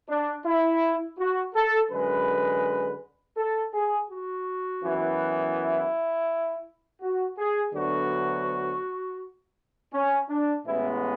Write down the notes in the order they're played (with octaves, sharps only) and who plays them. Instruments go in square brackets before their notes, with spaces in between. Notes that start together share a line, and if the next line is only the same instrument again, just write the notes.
[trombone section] D4
E4
F#4
A4
F#2 D3 G#3 B4
A4
G#4
F#4
F#2 E3 B3
E4
F#4
G#4
D2 D3 F#3 B3 F#4
C#4
D4
A1 A2 G#3 B3 E4